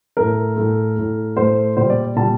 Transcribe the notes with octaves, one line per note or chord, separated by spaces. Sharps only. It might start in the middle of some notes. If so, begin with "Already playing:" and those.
A2 A3 A#4
A2 A3
A2 A3
A2 A3 C5
A#2 G3 C5
D5
A#2 G3 A5